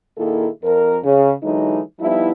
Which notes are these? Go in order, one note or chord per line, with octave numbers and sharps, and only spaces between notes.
A#2 D#3 A#3 E4 G#4 A4
F2 A#4
C#3
D3 E3 F#3 G#3 D#4
F3 G3 B3 D#4 E4